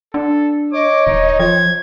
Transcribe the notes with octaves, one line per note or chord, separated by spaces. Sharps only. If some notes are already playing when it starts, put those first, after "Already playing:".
D4 A4
C#5 D#5 D6
D#1 D#4
F3 C5 G#6